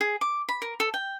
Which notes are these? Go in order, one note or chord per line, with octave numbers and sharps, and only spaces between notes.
G#4
D6
B5
A#4
A4
G5